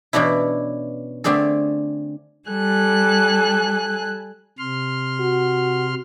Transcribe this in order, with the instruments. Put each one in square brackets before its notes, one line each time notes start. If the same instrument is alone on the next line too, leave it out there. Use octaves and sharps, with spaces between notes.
[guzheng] B2 E3 C#4 D4 E4
D3 A3 C4 D4 G#4 A4
[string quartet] G3 A4 G#5 F#6
[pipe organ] C3 C6 F6
[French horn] F#4